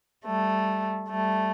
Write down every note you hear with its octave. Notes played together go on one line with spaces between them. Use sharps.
G3 A3
G3 A3